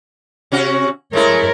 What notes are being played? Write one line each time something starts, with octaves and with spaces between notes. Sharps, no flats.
C3 C#4 F#4
G#3 A3 E4 A#4 C#5